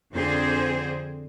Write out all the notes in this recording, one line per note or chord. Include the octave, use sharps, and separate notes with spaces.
F2 D3 C4 G#4 C5